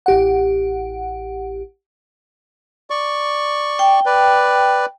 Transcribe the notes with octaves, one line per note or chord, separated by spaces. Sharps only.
A1 G4 F#5
D5 C#6
G5
B4 D5